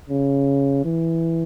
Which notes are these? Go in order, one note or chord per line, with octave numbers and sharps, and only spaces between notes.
C#3
E3